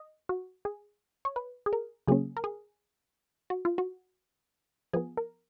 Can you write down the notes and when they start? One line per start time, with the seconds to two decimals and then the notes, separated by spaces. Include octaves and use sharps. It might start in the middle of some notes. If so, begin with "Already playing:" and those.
Already playing: D#5
0.29 F#4
0.65 G#4
1.25 C#5
1.36 B4
1.66 G#4
1.73 A#4
2.07 C#3 F#3 A#3 C#4 G#4
2.37 A#4
2.44 G#4
3.50 F#4
3.65 F4
3.78 F#4
4.94 F3 B3 G#4
5.17 A#4